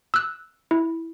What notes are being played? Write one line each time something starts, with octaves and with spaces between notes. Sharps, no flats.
E6 F#6
E4